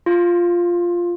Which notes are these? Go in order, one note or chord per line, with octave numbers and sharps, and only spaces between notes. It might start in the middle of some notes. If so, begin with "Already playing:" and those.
F4